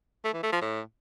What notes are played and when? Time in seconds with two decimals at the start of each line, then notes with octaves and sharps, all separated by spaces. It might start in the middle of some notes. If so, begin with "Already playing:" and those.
0.24 A3
0.34 E3
0.43 A3
0.52 F3
0.61 A2